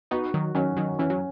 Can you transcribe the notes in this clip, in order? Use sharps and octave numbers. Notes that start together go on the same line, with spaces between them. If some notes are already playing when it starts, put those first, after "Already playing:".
B3 D#4 F#4
D#3 F#3
D#3 F#3 C#4
D#3 F#3
E3 C#4
F#3